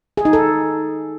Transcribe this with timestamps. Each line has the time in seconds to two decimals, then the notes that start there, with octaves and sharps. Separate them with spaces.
0.17 G#4
0.25 D#4
0.33 A4